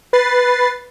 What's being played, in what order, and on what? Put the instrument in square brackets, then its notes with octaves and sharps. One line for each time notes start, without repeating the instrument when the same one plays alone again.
[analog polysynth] B4 A6 C7